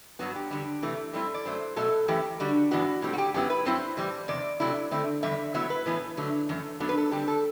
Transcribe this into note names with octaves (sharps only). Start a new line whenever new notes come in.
G2 F#3 B3 F#4
G4
E2 D3 G3
C3 E3 A3
A2 G3 C4 E4 A4
D5
F#2 F#3 A3 C5
B2 F#3 A3 A4
F#2 E3 A3 E4 G4
D3 G3 D4 F#4
G2 E3 B3 D4 F#4
A2 G3 C4
F#4
G4
F#2 F#3 B3 E4 G4
B4
G2 F#3 C4 E4 C5
A2 E3 G3
E2 C3 D5
C3 F#3 A3 E4
D3 A3 C4 E4
E2 D3 G3 E5
A2 F#3 B3 E4 E5
B4
A2 E3 B3 E4 B4
D3 F#3 A3
F#2 E3 A3
F#2 F#3 B3 D4 A4
B4
A4
D3 G3 C4 G4
A4